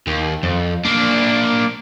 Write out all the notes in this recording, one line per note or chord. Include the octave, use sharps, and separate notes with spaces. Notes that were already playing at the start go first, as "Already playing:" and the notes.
D#2
F2
A#3 D4